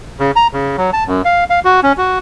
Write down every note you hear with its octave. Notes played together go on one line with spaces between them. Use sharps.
C#3
A#5
C#3
F#3
A5
F#2
F5
F5
F#4
C#4
F#4